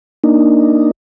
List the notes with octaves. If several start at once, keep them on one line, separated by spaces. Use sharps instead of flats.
A#3 D4 D#4